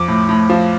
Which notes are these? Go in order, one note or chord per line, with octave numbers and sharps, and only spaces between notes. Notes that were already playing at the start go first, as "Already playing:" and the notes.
Already playing: F2 D6
A2
A2
F3